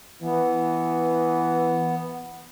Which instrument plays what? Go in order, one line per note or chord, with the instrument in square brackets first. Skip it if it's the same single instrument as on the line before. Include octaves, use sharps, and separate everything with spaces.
[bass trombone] E3 [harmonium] B3